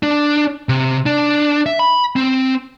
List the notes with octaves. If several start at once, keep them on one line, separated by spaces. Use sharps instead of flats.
D4
C3
D4
E5
B5
C4